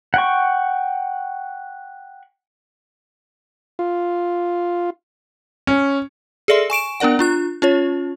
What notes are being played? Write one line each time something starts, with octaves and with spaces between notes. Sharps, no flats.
F#5 G5 C#6
F4
C#4
G#4 A4 D5 E5 C6
G#5 C#6 D7 E7
B3 D4 A#4 D5 F#5
D4 F4 F#6
C#4 F4 C#5